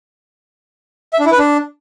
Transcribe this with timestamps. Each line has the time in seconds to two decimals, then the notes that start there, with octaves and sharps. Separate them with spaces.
1.13 E5
1.20 D4
1.26 E4
1.32 B4
1.38 D4